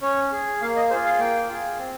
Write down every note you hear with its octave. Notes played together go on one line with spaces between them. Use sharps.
C#4 C#5
G#4
A#3 F5
D#5
F4 G#4 C5
F5
A#3 G5
F4 G#4
C4